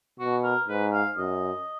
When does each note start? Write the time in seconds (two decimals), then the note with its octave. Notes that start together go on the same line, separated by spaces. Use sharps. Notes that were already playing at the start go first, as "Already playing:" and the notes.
0.19 B2 F#4
0.44 A#4
0.68 G#2 B4
0.93 F5
1.17 F#2 D#5